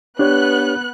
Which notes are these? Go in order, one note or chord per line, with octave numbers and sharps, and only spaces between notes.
B3 D4 G4 C#5 F#6